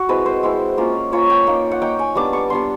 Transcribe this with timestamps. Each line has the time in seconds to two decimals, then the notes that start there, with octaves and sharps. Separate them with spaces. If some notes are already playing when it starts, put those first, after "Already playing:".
Already playing: F#4
0.09 G#3 C4 E4 B4
0.26 C5
0.43 G#3 C4 E4
0.78 A#3 C#4 F4
1.12 A#3 C#4 F4 C#5
1.30 G5
1.47 A#3 D#4
1.71 F#5
1.82 A#3 D#4 G5
1.99 G#5
2.15 G3 B3 D4 D6
2.33 C#6
2.50 G3 B3 D4 C6